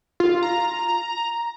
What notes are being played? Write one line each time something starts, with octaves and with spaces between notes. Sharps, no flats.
F4
A#5